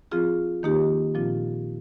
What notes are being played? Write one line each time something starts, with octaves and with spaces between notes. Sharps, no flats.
F3 C4 F4 G#4
D#3 A#3 D#4 G4
A#2 F3 C4 F4